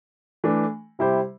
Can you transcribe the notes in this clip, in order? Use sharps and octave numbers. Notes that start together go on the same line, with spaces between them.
E3 A3 D4
C3 G3 E4 G4 C5